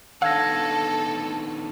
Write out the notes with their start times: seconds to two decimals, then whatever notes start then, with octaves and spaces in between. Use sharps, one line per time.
0.22 D#3 B3 D4 A4 F5 E6 G#6 A#6